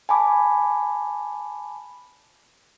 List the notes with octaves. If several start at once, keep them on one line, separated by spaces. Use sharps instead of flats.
G#5 A5 B5 D6